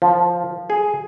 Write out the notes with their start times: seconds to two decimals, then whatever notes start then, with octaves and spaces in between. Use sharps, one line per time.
0.02 F3
0.70 G#4